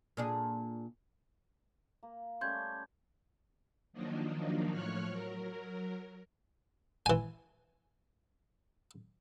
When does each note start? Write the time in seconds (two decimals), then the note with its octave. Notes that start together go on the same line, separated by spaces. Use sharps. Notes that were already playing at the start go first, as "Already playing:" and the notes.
0.17 A#2 D4 G#4
2.03 A#3
2.41 G3 A3 C#4 C6 G6 G#6
3.93 D#3 F3 F#3 A#3 D4 D#4
4.72 A2 F3 C#5 C#6 F6 F#6
5.09 F#3 A#4
7.06 E3 G#5